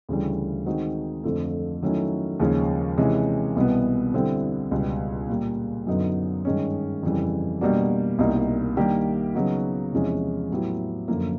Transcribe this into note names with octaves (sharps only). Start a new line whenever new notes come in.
D2 C#3 E3 G3
D#3 G#3 C4 D#4 F#4
F2 D3 F3 A3
D#3 F#3 A3 C#4 E4
D#2 C#3 F3 G#3 C#4
C3 E3 G#3 C#4
C2 B2 G3 B3
D3 G3 C4 E4
C#2 B2 G3 B3
A#2 G3 A#3
F#2 D3 F#3 B3 D#4
G2 D#3 G#3 C#4
F2 C#3 E3 G3
B2 G3 A#3 D4 F#4
C2 B2 G3 A#3 D#4
D#3 G3 A#3 D4 G4
C#3 F#3 B3 D#4 F#4
E2 C3 F3 G#3 C#4
A2 F#3 B3 E4 G4
F#2 D3 F3 A#3